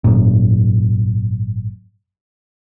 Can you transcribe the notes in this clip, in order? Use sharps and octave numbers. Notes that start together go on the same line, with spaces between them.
G#1 F#2 A#2